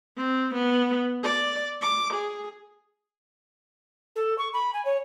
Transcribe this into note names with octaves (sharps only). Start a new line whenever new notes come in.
C4
B3
D5
D6
G#4
A4
C#6
B5
G#5
C#5